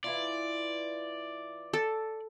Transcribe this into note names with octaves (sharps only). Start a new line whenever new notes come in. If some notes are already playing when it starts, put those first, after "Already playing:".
E3 E4 F4 D5
A4